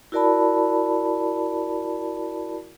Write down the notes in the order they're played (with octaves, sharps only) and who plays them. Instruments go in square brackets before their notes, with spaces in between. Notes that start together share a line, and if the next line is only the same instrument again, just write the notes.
[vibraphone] E4 F#4 A#4 D5 A5 B5